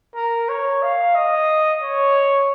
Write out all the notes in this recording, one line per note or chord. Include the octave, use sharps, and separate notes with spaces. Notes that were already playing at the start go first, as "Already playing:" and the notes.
A#4
C#5
F5
D#5
C#5